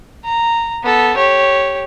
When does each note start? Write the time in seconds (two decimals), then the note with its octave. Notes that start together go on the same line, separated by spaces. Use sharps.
0.25 A#5
0.83 B3 A4
1.17 G4 C#5